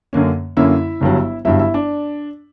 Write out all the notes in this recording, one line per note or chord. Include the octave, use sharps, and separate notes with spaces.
F#2 D3 A#3 C#4
F#2 D3 A#3 C#4 E4 E5
G1 G2 F#3
G1 G2 F#3 E4 E5
E4 E5
D4 D5